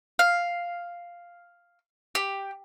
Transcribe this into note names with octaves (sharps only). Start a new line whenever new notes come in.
F5
G4